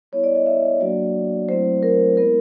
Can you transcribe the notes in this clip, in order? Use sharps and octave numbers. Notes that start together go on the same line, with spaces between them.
G3 B3 E4 C#5
D5
D#5
E5
F#3 A#3 D4 F#4 D5
F#3 A3 C4 E4 C5
A#4
G#3 B3 E4 A#4